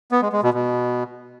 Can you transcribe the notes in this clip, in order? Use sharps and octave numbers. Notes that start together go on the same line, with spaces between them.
B3
G#3
G#3
B2
B2